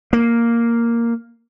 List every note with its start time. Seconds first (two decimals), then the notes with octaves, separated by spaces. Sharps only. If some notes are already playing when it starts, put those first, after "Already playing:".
0.13 A#3